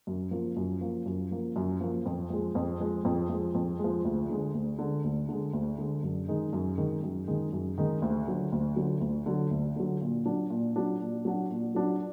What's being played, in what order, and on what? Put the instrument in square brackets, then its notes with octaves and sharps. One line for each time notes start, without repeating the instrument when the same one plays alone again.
[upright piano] F#2
F3 A#3
F#2
F3 A#3
F#2
F3 A#3
F#2
F3 A#3
F2
F3 G#3
F2
F3 G#3
F2
F3 G#3
F2
F3 G#3
D2
D3 G#3
D2
D3 G#3
D2
D3 G#3
D2
D3 G#3
F#2
D#3 G#3 D#4
F#2
D#3 G#3 D#4
F#2
D#3 G#3 D#4
F#2
D#3 G#3 D#4
D2
D3 F#3
D2
D3 F#3
D2
D3 F#3
D2
D3 F#3
A#2
F#3 D4 F#4
A#2
F#3 D4 F#4
A#2
F#3 D4 F#4
A#2
F#3 D4 F#4